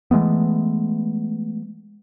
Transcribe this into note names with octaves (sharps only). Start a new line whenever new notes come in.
E3 G#3 A3 B3